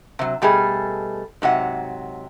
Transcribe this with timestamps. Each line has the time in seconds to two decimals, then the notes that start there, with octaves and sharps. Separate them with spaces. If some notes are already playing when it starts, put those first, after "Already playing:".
0.19 C3 F#3
0.42 B2 G3 A3 G#4
1.42 G#2 C3 F#3 F#5